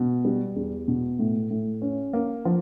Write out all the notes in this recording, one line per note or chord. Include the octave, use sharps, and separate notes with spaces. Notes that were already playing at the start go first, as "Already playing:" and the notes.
Already playing: B2
G3
E2
B2
A2
A2
C#4
A#3
F3